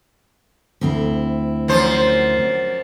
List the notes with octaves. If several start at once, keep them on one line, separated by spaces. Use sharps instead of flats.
D2 C4 E4
F#2 F3 C5